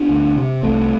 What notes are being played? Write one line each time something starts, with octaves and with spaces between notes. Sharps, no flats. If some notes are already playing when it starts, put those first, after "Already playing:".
Already playing: B3 D4
D2
C3
C2 A3 C4